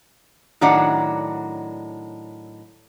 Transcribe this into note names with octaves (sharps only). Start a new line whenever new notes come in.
A2 D#3 F#3 D4 D5 F#5